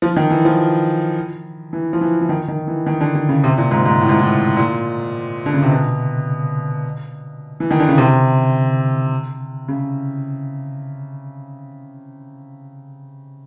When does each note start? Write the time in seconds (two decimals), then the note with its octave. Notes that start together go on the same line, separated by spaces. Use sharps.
0.02 F3
0.16 D#3
0.30 E3
0.45 F3
1.73 E3
1.93 F3
2.01 E3
2.21 E3
2.29 D#3
2.48 D#3
2.68 E3
2.86 D#3
3.01 D3
3.15 D3
3.29 C#3
3.44 C3
3.58 A#2
3.71 G#2
3.86 G#2
4.00 A2
4.09 G#2
4.19 A2
4.57 A#2
5.46 D3
5.54 C#3
5.63 C3
5.71 B2
7.60 E3
7.71 D#3
7.80 D3
7.88 C#3
7.98 C3
9.68 C#3